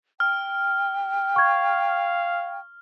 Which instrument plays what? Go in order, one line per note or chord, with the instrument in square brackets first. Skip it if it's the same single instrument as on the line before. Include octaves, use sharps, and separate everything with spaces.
[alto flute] G5 [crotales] F6
[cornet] F5 [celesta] C#6 G#6